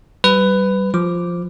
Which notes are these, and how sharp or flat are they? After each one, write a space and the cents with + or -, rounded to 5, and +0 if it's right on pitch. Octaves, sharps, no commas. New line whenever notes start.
G3 -30 B4 +15
F3 +0 D6 +0